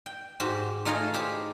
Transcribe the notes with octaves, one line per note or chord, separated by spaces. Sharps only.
G5
G#2 F#4 G4 C5
A3 D#4 F4 G#4 C#5 D#5
E4 G4 G#4 C5